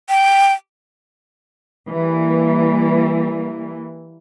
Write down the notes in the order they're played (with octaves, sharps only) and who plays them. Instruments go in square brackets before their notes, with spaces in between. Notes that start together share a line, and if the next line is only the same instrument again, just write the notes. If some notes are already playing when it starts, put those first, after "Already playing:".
[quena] G5
[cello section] E3 G3 A#3